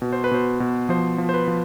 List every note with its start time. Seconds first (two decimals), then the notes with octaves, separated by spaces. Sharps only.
0.02 B2
0.13 C5
0.24 B4
0.31 B2 C5
0.60 B2
0.89 F3 C5
1.18 F3
1.29 C5
1.34 B4
1.48 F3